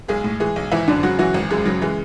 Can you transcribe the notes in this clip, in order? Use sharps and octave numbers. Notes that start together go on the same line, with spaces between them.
B1 G#3 G#4
A2
E3 G#3 G#4
B1
G#1 E3 E4
F#2 D3 D4
C#3 F#3 F#4
E3 F#3 F#4
G#1
F#2 G#3
C#3 F#3
E3 G#3